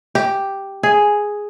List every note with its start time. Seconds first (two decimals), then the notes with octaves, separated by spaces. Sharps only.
0.15 G4
0.83 G#4